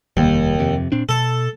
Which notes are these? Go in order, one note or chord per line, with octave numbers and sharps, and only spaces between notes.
F1 D#2 G3
F2 C3
A#2 C4 D4
B2 A4